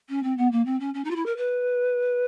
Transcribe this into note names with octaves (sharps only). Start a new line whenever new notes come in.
C#4
C4
B3
A#3
C4
C#4
C#4
D#4
F4
E4
A#4
B4